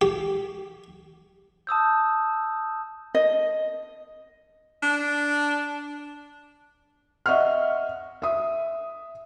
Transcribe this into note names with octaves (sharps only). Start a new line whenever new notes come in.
G4
A5 D#6 E6 G6
D#5
D4
D#5 E5 F#5 C#6 F6
E5 D#6